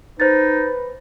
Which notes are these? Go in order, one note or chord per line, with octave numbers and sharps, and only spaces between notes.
D#4 B4 C5 A6